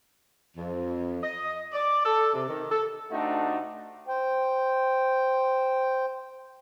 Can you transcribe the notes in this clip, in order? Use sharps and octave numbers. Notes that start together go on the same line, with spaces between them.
F2
D#5
D5
A4
C3
D#3
A4
C3 A3 D4 D#4 F#4
C5 G5